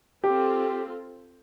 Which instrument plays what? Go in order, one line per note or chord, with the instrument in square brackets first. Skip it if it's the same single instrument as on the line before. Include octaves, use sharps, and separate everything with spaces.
[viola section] C4 F4 A4 [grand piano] G4